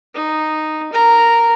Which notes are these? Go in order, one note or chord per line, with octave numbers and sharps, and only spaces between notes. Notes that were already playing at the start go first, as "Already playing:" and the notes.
D#4
A#4 A#5